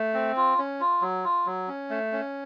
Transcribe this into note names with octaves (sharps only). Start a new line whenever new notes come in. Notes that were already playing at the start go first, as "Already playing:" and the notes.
Already playing: A3
C4
F4
C#4
F4
F#3
F4
F#3
C#4
A3
C#4